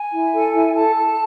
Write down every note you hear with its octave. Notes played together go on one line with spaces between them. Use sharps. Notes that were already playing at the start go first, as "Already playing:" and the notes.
Already playing: G#5
E4
A4
E4
A4 A5
A4